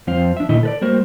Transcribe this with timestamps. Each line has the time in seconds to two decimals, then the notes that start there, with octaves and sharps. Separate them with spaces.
0.07 F2 F3 C4 C5 F5
0.37 D4 E5
0.49 A#2 D#3 A3 E4 D#5
0.63 A4 B4 D5
0.82 G3 A3 A#3 F#4 A#4 C5